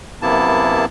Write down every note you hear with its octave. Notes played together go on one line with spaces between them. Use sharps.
F#2 C3 A#3 B3 E4 A5